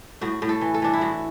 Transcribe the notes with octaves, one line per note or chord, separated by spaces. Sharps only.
A2 F#4
A2
A4
E3
A4
E3 D4
E4
A2 F#4